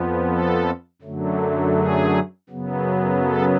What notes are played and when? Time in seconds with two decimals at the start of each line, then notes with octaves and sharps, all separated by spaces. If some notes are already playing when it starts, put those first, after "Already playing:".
Already playing: F2 F3 B3
0.26 A4
1.02 F#2 D3 F#3 A3
1.75 G#4
2.49 F#2 C#3 F#3 B3
3.22 A4